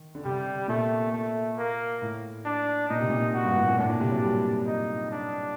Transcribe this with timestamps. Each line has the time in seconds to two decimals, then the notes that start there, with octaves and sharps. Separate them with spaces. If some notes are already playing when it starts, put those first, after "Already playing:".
Already playing: D#3
0.15 D3
0.24 C3 G3
0.68 A#2 A3
1.12 A3
1.57 A#3
2.02 A2
2.45 D4
2.89 A#2 D#4
3.00 C3
3.09 A#2
3.34 F#4
3.44 G2
3.56 A2
3.67 A#2
3.78 A2 D4
3.89 A#2
4.00 C3
4.11 F#3
4.23 G3
4.67 D#4
5.11 D4